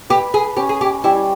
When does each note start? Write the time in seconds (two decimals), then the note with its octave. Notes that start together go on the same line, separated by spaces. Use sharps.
0.10 G4 B4
0.34 G#4
0.57 C#4 G4
0.69 G#4
0.81 G4
1.04 G3 E4